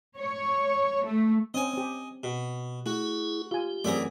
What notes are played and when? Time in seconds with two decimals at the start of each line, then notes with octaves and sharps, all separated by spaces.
0.17 C#5
1.04 A3
1.54 C4 C#4 D#5 G#5
1.73 C4 G4
2.23 B2
2.86 A3 E4 F#4 G#4
3.51 F4 G4 G#5
3.84 F#2 E3 A3 C4 G#4 D5 E5 A#5